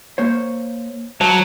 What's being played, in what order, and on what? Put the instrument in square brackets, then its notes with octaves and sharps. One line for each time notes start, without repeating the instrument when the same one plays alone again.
[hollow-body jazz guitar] A#3 C5 C#5
[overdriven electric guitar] F#3 [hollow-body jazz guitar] C5 A5